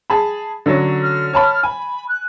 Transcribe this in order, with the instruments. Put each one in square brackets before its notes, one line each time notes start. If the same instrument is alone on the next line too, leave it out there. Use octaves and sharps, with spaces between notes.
[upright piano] G#4 A5 B5
D3 F#3 C#4
[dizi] F6
[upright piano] C#5 A5 B5
[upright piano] G#5 [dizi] B5
[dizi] F#6